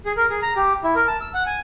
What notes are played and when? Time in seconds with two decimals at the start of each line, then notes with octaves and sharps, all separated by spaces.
0.06 G#4
0.17 A#4
0.30 G#4
0.42 A#5
0.56 G4
0.84 E4
0.95 A#4
1.07 A5
1.21 E6
1.34 F#5
1.46 G#5